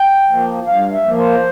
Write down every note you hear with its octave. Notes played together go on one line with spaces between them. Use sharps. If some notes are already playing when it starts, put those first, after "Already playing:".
Already playing: G5
F3 A#3
G2 F5
E5
F3 A#3
C5